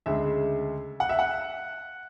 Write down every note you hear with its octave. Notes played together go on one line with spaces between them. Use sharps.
D2 C#3 G#3 E5
F#5
E5
F#5